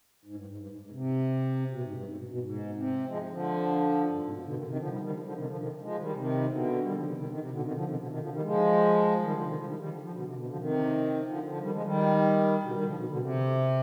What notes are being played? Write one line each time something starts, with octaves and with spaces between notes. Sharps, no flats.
G#2
G2
G#2
G2
G#2
G#2
C3
B2
G#2
G2
G#2
B2
B2
G#2
C3
F3 G#3
D3 F3
G2
G#2
C3
B2
B2 D3
C3 D#3
C3 D#3
D3 F3
D#3 G3
D#3 G3
D3 F3
D3 F3
C3 D#3
D3 F3
C3 D#3
F3 G#3
D#3 G3
C3 D#3
B2 D3
D#3 G3
D3 F3
C3 D#3
C3 D#3
C3 D#3
C3
B2 D3
C3 D#3
D3 F3
C3 D#3
B2 D3
C3 D#3
D3 F3
D#3 G3
F3 G#3
D#3 G3
D3 F3
C3 D#3
D3 F3
D#3 G3
D#3 G3
D3 F3
D3 F3
B2 D3
C3
B2 D3
D3 F3
C3 D#3
D3 F3
D3 F3
D#3 G3
F3 G#3
D#3 G3
B2 D3
D#3 G3
D3 F3
B2 D3
B2 D3
C3